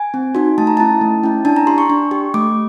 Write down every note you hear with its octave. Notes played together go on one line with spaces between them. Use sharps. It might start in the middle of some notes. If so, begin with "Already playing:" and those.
Already playing: G#5
C4
D#4 F#4
A3 A5
A#5
C#4 E4 A5
A3
C#4 E4
D4 A5
A#5
G4 C6
C#6
D4
G4
A3 D6